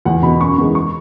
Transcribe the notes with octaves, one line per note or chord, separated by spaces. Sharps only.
E2 F#5
B2 B3 B5
F#2 C#6
E3 G#3 B3
C#6